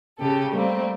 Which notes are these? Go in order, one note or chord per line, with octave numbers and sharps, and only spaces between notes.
C#3 G4 A4
G3 A3 A#3 C4